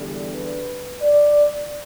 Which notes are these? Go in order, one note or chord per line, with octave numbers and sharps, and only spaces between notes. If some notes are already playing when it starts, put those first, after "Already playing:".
Already playing: E2 D3 G3 D4
B4
D5